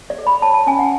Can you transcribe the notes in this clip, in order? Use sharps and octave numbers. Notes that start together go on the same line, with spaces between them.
D5
A4
B5
C#5 A5
A5
C#4 G#5
F#5